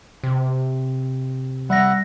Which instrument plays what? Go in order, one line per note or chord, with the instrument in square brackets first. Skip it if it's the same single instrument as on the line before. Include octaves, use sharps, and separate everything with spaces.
[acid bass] C3
[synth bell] G3 A#6 [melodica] E5 F#5